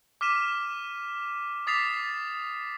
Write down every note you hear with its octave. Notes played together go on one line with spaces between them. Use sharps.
D6 F6 B6 D#7 E7
D6 D#6 A6 B6 C7 F7